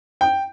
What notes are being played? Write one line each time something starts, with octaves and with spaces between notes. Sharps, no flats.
G5